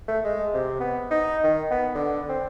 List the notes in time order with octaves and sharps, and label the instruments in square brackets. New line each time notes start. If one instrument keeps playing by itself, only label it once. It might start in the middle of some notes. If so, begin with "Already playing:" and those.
[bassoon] A3
G#3
C3
B3
D#4
D#3
B3
D3
C4